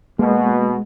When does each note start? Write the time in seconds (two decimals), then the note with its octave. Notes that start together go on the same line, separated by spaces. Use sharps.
0.19 B2 G#3 A#3